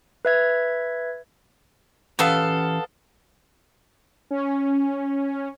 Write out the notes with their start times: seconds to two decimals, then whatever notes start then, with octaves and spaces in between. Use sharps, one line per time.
0.25 B4 E5 G#6
2.19 E3 B3 C#4 G4 A4 F5
4.31 C#4